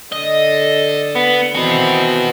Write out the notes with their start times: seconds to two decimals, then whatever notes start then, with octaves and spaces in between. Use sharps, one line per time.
0.12 D3 A4 D#5
1.15 B3
1.55 D#3 E3 C4 F#4 B4